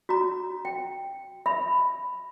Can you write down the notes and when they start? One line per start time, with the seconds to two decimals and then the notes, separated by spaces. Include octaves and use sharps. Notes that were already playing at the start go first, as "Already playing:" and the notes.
0.09 F#4 A#5
0.65 G5
1.46 E5 B5